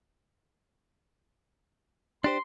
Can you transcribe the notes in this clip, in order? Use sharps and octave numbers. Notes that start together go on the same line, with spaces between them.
D4 G4 C5 C6